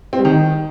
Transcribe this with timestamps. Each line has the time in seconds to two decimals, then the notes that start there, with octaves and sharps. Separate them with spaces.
0.13 C4
0.19 G3
0.25 D#3